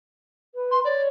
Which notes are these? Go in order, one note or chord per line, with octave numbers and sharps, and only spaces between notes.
B4
C6
C#5 D5